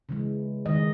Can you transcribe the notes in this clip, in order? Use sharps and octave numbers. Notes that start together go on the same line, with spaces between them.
C#3 E3 G#3
D#3 G#3 D#5